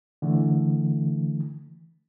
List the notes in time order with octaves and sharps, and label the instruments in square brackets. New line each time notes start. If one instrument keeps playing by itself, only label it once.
[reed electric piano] D3 E3 A3